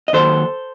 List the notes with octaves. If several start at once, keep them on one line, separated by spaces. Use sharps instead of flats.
D#5
D#2 D#3 F#3 A4 C5